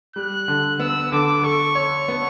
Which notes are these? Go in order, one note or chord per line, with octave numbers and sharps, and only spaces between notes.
G3 F#6
D3
B3 E6
D3 D6
A4 C#6
C#5
B3